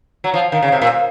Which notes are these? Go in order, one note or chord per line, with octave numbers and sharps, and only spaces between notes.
F#3
F3
D#3
C#3
C3
A#2